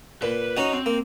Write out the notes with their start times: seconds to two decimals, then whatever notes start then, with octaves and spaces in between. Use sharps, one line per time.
0.22 A#2 B4
0.57 C#4 F#4 D#5 A#5
0.73 C4
0.86 A#3